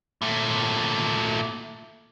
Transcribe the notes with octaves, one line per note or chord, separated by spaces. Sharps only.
A#2 A3